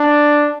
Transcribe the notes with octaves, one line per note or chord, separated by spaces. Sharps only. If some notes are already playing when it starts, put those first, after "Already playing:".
Already playing: D4